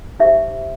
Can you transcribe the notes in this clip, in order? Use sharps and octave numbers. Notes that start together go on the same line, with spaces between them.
D#4 G4 C5 E5